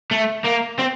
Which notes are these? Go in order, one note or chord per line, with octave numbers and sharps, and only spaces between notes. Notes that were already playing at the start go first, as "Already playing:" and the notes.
A3
A#3
C4